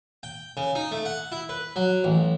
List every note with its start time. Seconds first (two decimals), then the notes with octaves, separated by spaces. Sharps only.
0.23 G5
0.57 C#3
0.75 D#4
0.92 A3
1.05 F#5
1.32 E4
1.49 B4
1.76 F#3
2.04 A1